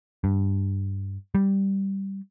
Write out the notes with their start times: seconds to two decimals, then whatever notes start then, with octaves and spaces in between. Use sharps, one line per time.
0.24 G2
1.35 G3